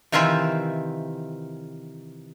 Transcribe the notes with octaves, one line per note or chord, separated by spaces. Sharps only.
C3 D#3 E3 F4 C5 E5